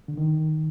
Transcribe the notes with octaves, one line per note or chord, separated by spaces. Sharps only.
D3
D#3